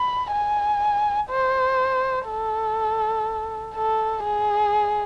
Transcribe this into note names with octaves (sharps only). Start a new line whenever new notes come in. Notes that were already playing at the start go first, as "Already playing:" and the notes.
Already playing: B5
G#5
C5
A4
A4
G#4